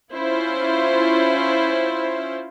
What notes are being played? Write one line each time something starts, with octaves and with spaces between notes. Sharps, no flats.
C#4 E4 F4 C5